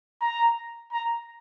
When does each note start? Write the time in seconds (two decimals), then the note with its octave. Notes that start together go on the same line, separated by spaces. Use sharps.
0.21 A#5
0.92 A#5